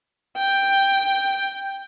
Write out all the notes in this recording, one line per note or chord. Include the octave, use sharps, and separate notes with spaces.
G5